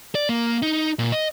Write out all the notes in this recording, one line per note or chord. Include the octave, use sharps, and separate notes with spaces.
D5
A#3
D#4
A#2
D#5